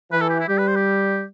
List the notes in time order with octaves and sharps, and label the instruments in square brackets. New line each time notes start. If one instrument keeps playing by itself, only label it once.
[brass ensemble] E3 [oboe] B4
[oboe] A4
G4
E4
[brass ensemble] G3 [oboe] G4
[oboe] B4
C5
G4